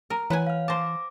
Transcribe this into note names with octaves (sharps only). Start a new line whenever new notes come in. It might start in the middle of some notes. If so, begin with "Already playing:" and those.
A#4
E3 B4 C#5 F#5 G#5
F5 F6
C5 A5 D6 A#6